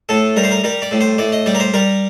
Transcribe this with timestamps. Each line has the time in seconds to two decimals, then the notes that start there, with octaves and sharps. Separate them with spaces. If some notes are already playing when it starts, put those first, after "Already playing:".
0.09 A2 A4
0.36 G3 A#4
0.44 C5
0.51 A#4
0.64 G3 A#4
0.82 D5
0.91 A2
1.01 C5
1.18 A2 D5
1.32 D#5
1.46 G3 D5
1.55 A#4
1.60 C5
1.74 G3 A#4